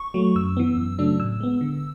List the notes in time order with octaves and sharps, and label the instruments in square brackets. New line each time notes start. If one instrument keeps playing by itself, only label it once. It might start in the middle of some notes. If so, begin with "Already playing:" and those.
Already playing: [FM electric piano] C#6
F#3 A3
F#2 E6
E3 B3
F#2
C#3 F#3 A3 D4
A2 E6
G#3 B3
D3